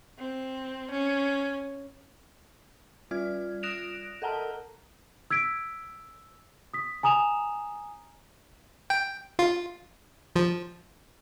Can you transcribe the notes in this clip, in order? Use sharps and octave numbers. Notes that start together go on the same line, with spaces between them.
C4
C#4
G3 F4 D5 F6 G#6
D#6 F#6 A#6 D7 E7 F7
A4 A#4 F#5 A5 A#5 F6
E6 G#6 B6 D7
D#6 B6
G#5 A#5 D#6 E7 F7
G5
F4
F3